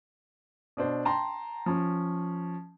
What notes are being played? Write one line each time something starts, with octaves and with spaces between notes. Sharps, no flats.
B2 D4 C5
G5 A5 A#5 C6
F3 C#4